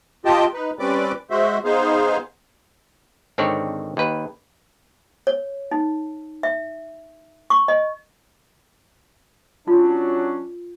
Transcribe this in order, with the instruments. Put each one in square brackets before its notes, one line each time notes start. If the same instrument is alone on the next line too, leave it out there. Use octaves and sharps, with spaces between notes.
[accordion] F4 G4 D#5 G5 A5
D#4 B4
G3 C4 C#4 B4 D5 D6
G#3 F#4 C5 E5
B3 D#4 G#4 C5 F5
[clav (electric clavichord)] G#1 D3 D#3 C4 C#5 D5
D#2 B4
[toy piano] C#5
D#4
E5
C#6
D#5
[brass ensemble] F#3 C#4 D4 [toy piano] F4